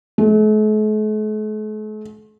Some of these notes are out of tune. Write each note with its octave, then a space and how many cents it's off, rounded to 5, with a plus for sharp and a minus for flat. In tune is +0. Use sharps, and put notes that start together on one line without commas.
A3 -45